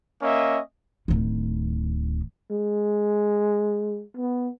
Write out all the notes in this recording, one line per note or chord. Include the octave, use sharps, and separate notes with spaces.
A#3 C#4 D#5 E5
D1 D#3
G#3
B3